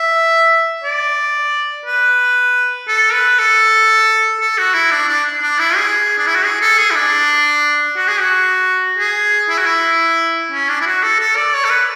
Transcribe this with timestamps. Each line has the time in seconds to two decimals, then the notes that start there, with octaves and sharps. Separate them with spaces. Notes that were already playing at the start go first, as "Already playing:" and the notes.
Already playing: E5
0.84 D5
1.86 B4
2.88 A4
3.13 B4
3.39 A4
4.40 A4
4.58 F#4
4.74 E4
4.91 D4
5.08 D4
5.42 D4
5.59 E4
5.77 G#4
6.18 D4
6.27 E4
6.36 F#4
6.44 G#4
6.61 A4
6.78 G#4
6.91 E4
6.95 D4
7.97 F#4
8.08 G#4
8.20 F#4
8.98 G#4
9.49 E4
9.58 F#4
9.66 E4
10.52 C#4
10.69 D4
10.81 E4
10.86 F#4
11.03 A4
11.19 A4
11.36 D5
11.54 C#5
11.65 A4
11.70 B4